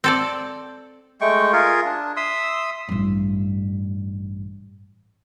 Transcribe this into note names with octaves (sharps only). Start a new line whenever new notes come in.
C4 A4 D5
G#3 A3 G5 C#6
F4 G#4 A#4
D4
E5 C6 D#6 E6
A1 G2